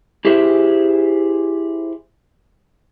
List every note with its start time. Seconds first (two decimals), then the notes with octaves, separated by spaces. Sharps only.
0.25 E4 G4 G#4 C5 E5